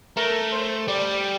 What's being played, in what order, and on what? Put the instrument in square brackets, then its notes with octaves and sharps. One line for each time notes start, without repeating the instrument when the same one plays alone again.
[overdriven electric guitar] A3 [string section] A#4
[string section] C5
[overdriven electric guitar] G3 [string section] D5